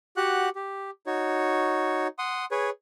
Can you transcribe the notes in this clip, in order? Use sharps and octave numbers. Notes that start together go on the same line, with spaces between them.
F#4 G4 F#5 F#6
G4
D#4 F#4 C#5
F#5 C6 D#6
G#4 B4 C#5